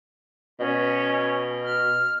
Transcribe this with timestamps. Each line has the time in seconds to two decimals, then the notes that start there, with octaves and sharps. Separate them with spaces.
0.60 B2 C#4
1.65 F6